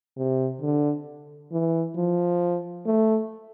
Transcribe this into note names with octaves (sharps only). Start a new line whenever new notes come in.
C3
D3
E3
F3
A3